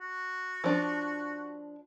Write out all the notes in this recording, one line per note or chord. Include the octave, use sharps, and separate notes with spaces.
F#4
F3 D4